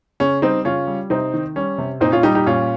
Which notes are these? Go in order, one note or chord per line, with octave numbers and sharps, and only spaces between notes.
C#3 C#4
G3 C4 D#4
C#3 C#4 F4
G3
C3 C4 D#4
D#3
G3 C#4
C3
A#2 C4 D#4
C#4 F4
G3 D#4 G4
D#4 G4
A#2 C#4 F4